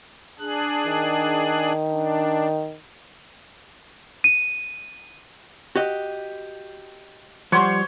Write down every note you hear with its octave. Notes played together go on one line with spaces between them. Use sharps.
D4 G#4 F#6
D#3
D4
D#7
F#4 G4 D#5
F3 G3 C5 C#5 F#5 C6 C#6